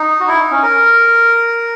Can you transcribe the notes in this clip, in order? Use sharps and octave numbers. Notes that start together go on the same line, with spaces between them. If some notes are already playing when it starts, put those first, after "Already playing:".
Already playing: D#4
F#4
E4
D#4
C#4
A#4